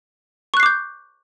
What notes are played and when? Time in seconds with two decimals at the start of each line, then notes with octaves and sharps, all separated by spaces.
0.54 C#6
0.57 F#6
0.60 C7
0.63 D6
0.66 G6